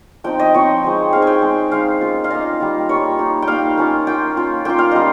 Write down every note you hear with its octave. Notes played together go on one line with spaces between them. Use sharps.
F3 C4 D#4 G5
D#5
F3 C4 D#4 C#5
G#3 C4 D#4
G#3 C4 D#4 F5
G5 G#5
G#3 D#4
G#3 D#4 F5
A#3 C#4 F4
F5
A#3 C#4 F4 D#5
G3 A#3 F4
G3 A#3 F4 C#5
A#3 D#4
G5
A#3 D#4 F5
A#3 C#4 F4
A#3 C#4 F4 G5
A#3 C#4 F4
A#3 C#4 F4 G5
F5
G3 A#3 C#4 F4 D#5